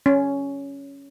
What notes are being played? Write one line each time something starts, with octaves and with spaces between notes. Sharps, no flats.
C#4